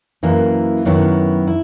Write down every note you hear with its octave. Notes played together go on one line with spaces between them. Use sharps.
F#2 E3 A#3 E4
F#2 D#3 F#3 B3 E4
E4